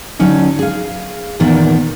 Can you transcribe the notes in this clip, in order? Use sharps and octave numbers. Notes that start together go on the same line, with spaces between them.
D3 F#3 C#4 D#4
G#4 F5
E2 A#2 D#3 B3